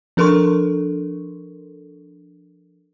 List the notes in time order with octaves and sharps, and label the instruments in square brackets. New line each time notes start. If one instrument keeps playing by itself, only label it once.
[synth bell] F3 D4 A4 A#4 C6 C#6